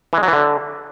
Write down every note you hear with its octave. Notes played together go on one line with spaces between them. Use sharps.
E3
G#3
F#3
E3
D3